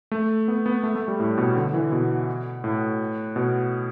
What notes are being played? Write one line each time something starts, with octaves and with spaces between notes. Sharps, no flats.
A3
B3
B3
A3
A3
G3
A2
B2
D3
E3
B2
A2
B2